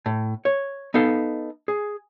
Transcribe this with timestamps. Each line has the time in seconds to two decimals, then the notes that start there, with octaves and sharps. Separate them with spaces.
0.06 A2
0.45 C#5
0.94 B3 D#4 A4 F5
1.68 G#4